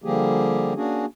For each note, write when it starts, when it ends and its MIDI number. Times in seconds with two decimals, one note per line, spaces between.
0.04 0.74 50
0.04 0.74 53
0.04 0.74 55
0.04 0.74 58
0.04 0.74 67
0.04 0.74 68
0.76 1.06 58
0.76 1.06 61
0.76 1.06 62
0.76 1.06 66
0.76 1.06 68